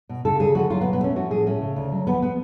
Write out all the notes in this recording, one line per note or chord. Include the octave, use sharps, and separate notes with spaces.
B2
C#3 A4
D2 G#4
F3 F#4
F#3 F4
B3
B2
B3
A3 C#4
F3 F#4
A2 G#4
A3 C#4
C#3
D2
F#3
F3 B3
B3